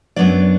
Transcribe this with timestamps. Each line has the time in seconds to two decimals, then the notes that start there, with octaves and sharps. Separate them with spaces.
0.16 F#2 F#3 B3 D4 D5